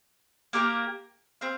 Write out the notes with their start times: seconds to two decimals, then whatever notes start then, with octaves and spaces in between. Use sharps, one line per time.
0.53 A#3 G4 A#4 G5
1.41 C4 F5